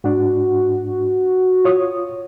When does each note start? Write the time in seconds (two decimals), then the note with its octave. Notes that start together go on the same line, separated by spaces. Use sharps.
0.04 G#2 D4 F#4
1.64 F4 C#5 D#6